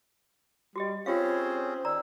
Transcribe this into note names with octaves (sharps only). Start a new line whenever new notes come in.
G3 F#4 G4 D#5
C4 C#4 F4 G4 G#4 C5 C#5 F5
D#3 D5 A#5 E6